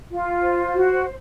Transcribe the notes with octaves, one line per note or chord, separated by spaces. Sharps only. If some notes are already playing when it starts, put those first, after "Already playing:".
F4
C5
F#4